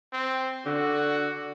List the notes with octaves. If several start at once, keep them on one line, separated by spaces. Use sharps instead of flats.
C4
D3 F#4